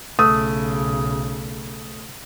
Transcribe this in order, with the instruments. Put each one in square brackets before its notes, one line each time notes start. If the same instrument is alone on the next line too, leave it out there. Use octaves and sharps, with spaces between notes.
[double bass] B1 C#3 [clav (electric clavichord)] A3 [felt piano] D#6